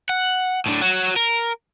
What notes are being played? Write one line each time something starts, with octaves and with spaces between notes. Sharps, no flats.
F#5
A2 D4
F#4 C#5
A#4